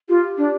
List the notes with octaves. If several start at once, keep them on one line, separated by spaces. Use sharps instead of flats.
F4 G4
D4